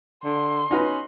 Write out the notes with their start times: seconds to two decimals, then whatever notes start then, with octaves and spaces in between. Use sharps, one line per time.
0.25 D3 C6
0.71 C#4 D#4 F#4 B4